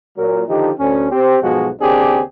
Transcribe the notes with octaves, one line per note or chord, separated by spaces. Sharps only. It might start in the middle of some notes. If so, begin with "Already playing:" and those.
A#2 F#3 A#4
D3 D#3 F3 D#4 G4
D2 C#4
C4 G4
B1 G#2 B2 F3 G#3 F#4
D#2 C#3 C4 D4 G4 G#4